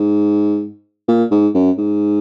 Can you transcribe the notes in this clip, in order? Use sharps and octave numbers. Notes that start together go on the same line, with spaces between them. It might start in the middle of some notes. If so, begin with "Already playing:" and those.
Already playing: G#2
A#2
G#2
F#2
G#2